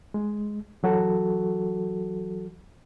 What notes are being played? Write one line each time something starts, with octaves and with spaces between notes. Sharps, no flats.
G#3
E3 F#3 F#4 A4